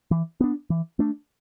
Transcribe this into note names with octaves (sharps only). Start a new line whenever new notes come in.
E3
B3 D4
E3
A3 D4